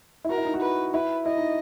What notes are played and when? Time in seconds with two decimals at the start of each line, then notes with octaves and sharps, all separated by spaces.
0.25 E4
0.29 F#4 A#4
0.38 E4
0.45 D#4
0.54 F#4
0.61 B4
0.94 E4 B4
1.26 E4 D#5
1.37 D#4